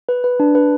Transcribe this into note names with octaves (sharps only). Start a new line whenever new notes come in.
B4
B4
D4
B4